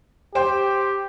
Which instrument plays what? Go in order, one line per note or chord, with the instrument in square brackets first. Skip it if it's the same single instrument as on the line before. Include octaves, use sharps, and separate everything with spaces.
[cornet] G4 [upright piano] C5 G5